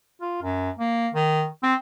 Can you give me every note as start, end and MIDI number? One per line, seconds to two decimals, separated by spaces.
0.21 0.42 65
0.43 0.70 42
0.80 1.09 58
1.15 1.46 51
1.63 1.75 60